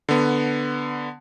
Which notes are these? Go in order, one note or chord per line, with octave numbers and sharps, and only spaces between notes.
D3 B3